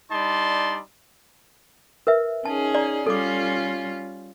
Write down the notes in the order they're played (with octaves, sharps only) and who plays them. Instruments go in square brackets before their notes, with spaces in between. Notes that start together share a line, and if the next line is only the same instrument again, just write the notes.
[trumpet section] G3 D4 D#4 D5 A5 C6
[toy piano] A#4 B4 E5
[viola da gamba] C#4 D#4 G#4 [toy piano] A5
[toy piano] D5 A#5
[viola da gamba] G3 C#4 F4 [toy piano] A4 D6